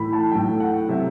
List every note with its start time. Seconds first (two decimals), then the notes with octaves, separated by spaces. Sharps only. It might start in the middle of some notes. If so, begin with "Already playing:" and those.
Already playing: A2 E3 B5
0.13 A5
0.31 A2 F#3 G5
0.60 F#5
0.89 C3 F#3 E5